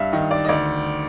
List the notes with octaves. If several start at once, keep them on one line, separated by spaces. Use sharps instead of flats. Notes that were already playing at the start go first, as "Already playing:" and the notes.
Already playing: G2 E5 F5
D#3 D#5
D5
D#5
D2 D5